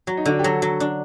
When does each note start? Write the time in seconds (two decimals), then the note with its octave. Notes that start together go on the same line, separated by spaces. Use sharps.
0.07 F#3 F#4
0.17 D#4
0.25 D3 D4 F#4
0.39 G4
0.44 F#3 F#4 A4
0.62 F#3
0.80 D4